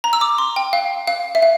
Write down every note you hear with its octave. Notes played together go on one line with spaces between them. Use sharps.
A#5
E6
D6
C6
G5
F5
F5
E5
F5